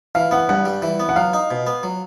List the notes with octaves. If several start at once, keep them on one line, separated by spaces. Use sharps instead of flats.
E3 F5
B3 F#5
G2 F#5
G3
E3
B3
F#5
F#3 F5
D#4
B2
B3
F#3